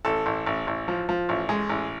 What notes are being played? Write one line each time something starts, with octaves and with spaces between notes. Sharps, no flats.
A1 A4
A1
A1
A1
F3
F3
A1
G#3
A1